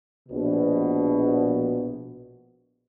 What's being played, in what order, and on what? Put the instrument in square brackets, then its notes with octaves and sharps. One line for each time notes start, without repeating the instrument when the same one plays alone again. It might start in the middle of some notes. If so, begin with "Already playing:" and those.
[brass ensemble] A#1 B2